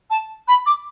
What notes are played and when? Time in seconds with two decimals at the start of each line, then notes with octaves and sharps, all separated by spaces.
0.10 A5
0.48 B5
0.66 D6